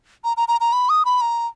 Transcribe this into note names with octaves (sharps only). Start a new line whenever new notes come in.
A#5
A#5
A#5
A#5
B5
D#6
B5
A#5